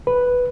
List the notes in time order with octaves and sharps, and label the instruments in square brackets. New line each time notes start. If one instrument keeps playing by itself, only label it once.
[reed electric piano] B4